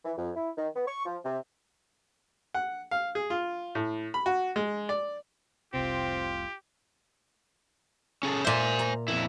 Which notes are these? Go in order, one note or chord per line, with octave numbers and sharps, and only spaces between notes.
E3
F2
E4
D#3
B3
C#6
F3
C3
F#5
F5
G#4
F4
A2
B5
F#4
G#3
D5
F1 C2 C3 C4 F4 G4
C#4 G#4 A4
A#2 C5 E5 G#5
A#5
F2 C#3 E4